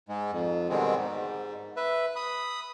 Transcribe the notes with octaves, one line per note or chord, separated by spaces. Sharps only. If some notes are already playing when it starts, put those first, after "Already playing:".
G#2 G#3
F2
B2 D3 D#3 G3 G#3 C4
G#2
B4 E5
B5 D#6